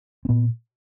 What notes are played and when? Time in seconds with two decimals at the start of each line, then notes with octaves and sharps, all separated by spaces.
0.25 C4
0.29 A#2 B3